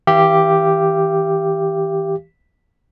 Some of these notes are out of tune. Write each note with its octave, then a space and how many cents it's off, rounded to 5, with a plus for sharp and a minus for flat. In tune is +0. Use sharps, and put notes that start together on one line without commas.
E3 -40 G4 +0 F5 -45